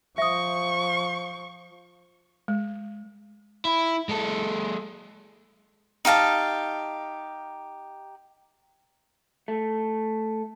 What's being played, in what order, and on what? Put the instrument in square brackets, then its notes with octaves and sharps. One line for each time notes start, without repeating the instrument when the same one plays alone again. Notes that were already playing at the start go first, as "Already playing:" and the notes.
[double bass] F3 [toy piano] E5 D#6 [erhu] C#6
[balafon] G#3
[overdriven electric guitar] E4
G#3 A4
[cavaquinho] D#4 G4 F5 A5
[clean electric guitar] A3